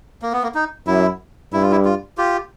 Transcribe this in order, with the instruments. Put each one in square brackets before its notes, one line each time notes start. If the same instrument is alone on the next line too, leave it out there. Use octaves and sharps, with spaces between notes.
[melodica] A#3
B3
A#3
D#4
[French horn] F#2 [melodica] E4
[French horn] G2 [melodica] E4
[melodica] F4
E4
F4
F4 G4